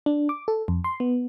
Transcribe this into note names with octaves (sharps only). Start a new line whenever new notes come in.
D4
D6
A4
F2
C6
B3